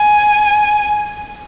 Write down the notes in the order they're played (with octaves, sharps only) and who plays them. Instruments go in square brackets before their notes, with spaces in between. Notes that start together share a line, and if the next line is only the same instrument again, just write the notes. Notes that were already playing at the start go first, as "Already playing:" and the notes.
Already playing: [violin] G#5